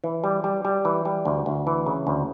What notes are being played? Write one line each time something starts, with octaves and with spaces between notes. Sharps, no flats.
E3
G3
G3
G3
E3
G3
D2
D2
E3
C#3
D2